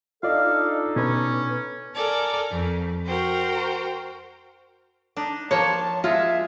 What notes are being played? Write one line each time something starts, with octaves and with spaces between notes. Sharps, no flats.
D4 D#4 F4 A4 D5 D#5 F5
B2 C#4 B4
A4 A#4 D5 G#5
F2
F#4 A#4 C5 G5
D4 D#4
F3 A#3 C#5 A5
G#3 F4 E5